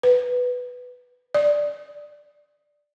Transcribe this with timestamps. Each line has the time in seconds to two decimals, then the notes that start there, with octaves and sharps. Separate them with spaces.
0.03 B4
1.34 D5